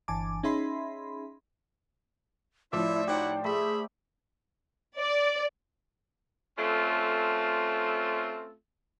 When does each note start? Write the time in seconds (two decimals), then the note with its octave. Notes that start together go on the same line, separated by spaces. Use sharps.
0.08 G1 E3 G#5 A5 D6
0.43 C#4 D#4 G#4 E5 B5 C6
2.73 A2 F3 E4 C5 D5 E5
3.08 D#4 E4 F#4 G4 C5 F#5 G5
3.44 A3 G#4 E5 B5
4.97 D5
6.57 A3 C4 C#4 F4 A4